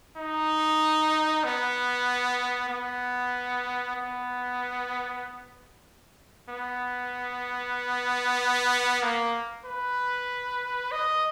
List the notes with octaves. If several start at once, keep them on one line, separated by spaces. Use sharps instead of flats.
D#4
B3
B3
B3
B3
A#3
B4
D#5